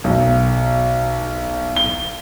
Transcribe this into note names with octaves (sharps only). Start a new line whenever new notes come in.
B1
G7